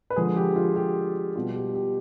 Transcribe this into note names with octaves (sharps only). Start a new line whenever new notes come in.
B4
D3 F3 G#3 G#4
G4
F4
G4
B2 G3 F4
G4
G4